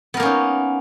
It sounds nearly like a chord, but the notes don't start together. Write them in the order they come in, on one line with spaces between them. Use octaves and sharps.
B3 A#4 A#3 C#4 D#4